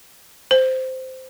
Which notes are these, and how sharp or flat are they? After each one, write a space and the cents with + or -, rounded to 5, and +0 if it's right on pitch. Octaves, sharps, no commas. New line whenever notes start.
C5 -10